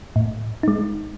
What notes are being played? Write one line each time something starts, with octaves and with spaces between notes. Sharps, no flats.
A2
G#3 D#4